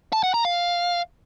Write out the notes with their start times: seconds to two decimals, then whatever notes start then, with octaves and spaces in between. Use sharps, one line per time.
0.13 A5
0.24 F#5
0.34 A#5
0.45 F5